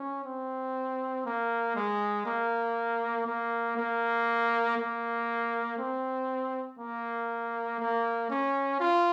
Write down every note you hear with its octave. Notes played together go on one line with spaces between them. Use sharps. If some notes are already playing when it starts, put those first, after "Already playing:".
Already playing: C#4
C4
A#3
G#3
A#3
A#3
A#3
A#3
C4
A#3
A#3
C#4
F4